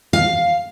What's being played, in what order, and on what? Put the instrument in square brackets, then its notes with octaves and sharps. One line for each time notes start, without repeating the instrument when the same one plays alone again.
[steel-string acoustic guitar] F5